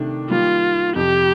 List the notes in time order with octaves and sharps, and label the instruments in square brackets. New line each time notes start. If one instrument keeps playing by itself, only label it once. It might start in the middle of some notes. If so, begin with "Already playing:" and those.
Already playing: [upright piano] C3 D#3 A3 D4
[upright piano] D#3 G3 A#3 [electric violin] F4
[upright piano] F2 C3 F3 [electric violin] G4